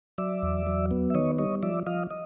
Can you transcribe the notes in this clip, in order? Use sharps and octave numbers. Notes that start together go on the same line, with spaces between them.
F#3 D5 E5
E2
F#3
B3
E5
D#3 C#5 D#5
G3 C#5 D#5
F3 D5 E5
F3 D#5 F5
D#5